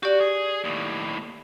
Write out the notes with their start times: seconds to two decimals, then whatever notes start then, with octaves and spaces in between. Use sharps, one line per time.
0.03 F#4 G4 D5
0.21 G#4
0.64 D#2 A2